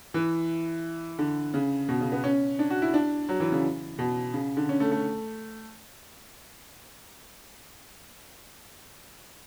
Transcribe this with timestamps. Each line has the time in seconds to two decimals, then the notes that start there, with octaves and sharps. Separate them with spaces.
0.14 E3
1.19 D3
1.54 C#3
1.89 B2
2.01 C#3
2.12 B3
2.24 C#4
2.59 D4
2.70 F#4
2.82 E4
2.94 D4
3.29 F#3
3.40 E3
3.52 C#3
3.99 B2
4.34 C#3
4.57 D3
4.69 C#4
4.80 A3
4.91 A3